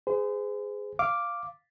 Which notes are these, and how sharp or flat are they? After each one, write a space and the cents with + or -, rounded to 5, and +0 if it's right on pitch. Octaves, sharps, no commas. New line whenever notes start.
G#4 +0 C5 -40
F5 -5 D6 +0